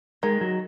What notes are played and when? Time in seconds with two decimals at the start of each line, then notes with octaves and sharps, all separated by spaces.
0.23 D#3 G#3
0.41 F#3